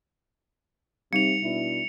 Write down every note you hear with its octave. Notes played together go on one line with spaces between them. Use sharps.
C3 G3 D#4 C#7 F7
B2 D4 E4